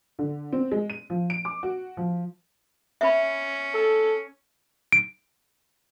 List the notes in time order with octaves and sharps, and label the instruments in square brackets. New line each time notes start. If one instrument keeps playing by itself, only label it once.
[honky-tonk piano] D3
C4
G#3
D#7
F3
D7
D6
F#4
F3
[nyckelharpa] C#4 [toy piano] E5 B5
[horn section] A4
[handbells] D7